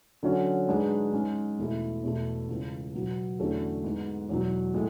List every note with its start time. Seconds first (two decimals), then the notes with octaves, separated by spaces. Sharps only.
0.23 D3 F#3 C#4 F#4 C#5
0.68 G#2 G#3 D4 G#4 B4
1.13 G#2 G#3 C#4
1.58 E2 B2 A3 E4
2.03 E2 B2 A3 E4 A4
2.49 C#2 C#3 E3
2.94 B2 F#3 B3
3.39 E2 D3 A3 C#4 F#4
3.84 G#2 G#3 B3
4.29 E2 B2 F#3
4.74 A2 G#3